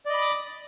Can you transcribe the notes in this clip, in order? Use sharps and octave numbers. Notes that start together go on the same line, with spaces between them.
D5 D#5 B5 D6 D#6